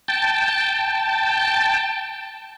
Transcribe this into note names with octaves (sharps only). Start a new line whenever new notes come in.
G5 A5